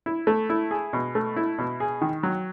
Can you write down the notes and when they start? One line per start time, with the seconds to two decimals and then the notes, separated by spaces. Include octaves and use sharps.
0.06 E4
0.27 A3
0.50 E4
0.71 G#4
0.93 B2
1.15 A3
1.36 E4
1.59 B2
1.80 G#4
2.01 D#3
2.23 F#3